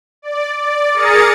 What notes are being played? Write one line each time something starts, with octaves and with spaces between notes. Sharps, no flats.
D5
D5
G#4 A#4 A#5 D#6 A6 C#7